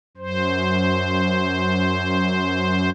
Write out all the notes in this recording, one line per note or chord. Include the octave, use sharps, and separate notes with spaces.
F#2 C5